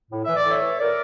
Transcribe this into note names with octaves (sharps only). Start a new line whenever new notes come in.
A2
E3 E5
D5
A2 C#5 E5
E3
A#2 A#4 D5